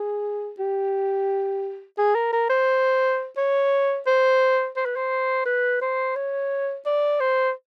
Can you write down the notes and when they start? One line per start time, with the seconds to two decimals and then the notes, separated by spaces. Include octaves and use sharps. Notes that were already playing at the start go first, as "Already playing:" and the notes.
Already playing: G#4
0.59 G4
1.98 G#4
2.15 A#4
2.33 A#4
2.49 C5
3.37 C#5
4.06 C5
4.76 C5
4.85 B4
4.96 C5
5.45 B4
5.81 C5
6.15 C#5
6.85 D5
7.20 C5